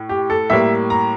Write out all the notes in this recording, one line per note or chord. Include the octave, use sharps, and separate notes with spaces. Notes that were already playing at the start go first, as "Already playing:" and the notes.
Already playing: A2
G4
A4
A2 G3 A#3 E5
A#5